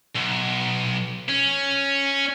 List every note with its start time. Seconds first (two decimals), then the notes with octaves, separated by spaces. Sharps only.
0.15 B1
1.29 C#4